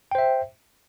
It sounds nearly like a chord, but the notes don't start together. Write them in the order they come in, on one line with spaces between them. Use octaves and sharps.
G5 C5 E5